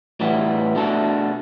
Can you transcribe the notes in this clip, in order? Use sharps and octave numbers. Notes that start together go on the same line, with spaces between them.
A2 E3 G3 B3 E4
B2 A3 D4 A4